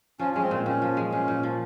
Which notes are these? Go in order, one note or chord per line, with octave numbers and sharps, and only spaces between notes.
F3 C#4
G#3 C#4
C4
A#2
A#2 C#4
F3
G#3
A#2 C#4
A#2
F3